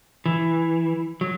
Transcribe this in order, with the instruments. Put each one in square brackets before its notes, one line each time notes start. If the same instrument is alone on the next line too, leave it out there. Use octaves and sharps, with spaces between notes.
[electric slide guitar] E3
F#3